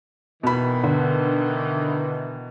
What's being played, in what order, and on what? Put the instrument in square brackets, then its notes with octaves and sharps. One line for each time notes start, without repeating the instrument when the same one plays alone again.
[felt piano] B2 B5 [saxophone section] D#3 E3
[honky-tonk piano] D3